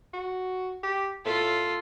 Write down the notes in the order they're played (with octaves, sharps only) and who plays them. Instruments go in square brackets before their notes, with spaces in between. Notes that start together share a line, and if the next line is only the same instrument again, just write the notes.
[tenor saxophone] F#4
G4
[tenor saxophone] A2 [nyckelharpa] F4 A4